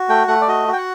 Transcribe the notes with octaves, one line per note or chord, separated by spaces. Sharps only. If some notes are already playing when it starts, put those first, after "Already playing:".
Already playing: F#4
A3 G5
A3 F#5
D5
F#4 D#5
F#4
G5
F#5